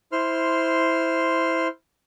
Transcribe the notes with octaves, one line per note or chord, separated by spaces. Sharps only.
E4 C5 C6 F6